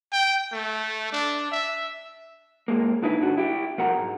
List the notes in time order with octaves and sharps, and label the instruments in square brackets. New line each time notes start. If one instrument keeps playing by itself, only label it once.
[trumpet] G5
A3
D4
E5
[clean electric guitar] G2 G#3 A#3
D3 D#4 E4 B4
G2 D3 F#4
E4 G4
B2 F3 A#4 F#5 A#5
B1 G#2